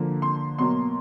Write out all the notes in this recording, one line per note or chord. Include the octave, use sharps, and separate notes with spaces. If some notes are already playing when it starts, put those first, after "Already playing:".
Already playing: D3 F3 A#3
C6
B2 F#3 A#3 C6